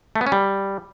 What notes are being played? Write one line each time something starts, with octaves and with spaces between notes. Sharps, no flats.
A3
B3
C#4
G3